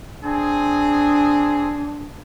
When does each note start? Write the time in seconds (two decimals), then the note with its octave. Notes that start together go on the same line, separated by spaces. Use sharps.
0.24 C4 D4 G#4